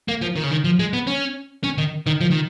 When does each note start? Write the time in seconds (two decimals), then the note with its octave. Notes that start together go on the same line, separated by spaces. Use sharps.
0.09 A#3
0.22 F3
0.36 D#3
0.44 C#3
0.51 D#3
0.64 F3
0.79 G#3
0.93 B3
1.07 C#4
1.64 C#4
1.78 D#3
2.07 D#3
2.21 F3
2.31 D#3